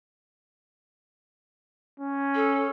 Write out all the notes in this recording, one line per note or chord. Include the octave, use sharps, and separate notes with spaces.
C#4
A4